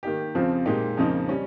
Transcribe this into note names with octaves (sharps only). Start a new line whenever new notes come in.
D#3 A#3 D#4 G4
F2 C#3 F3 C4 F4
A#2 G#3 D#4 G4
F2 C#3 F3 A#3 D#4
G3 C#4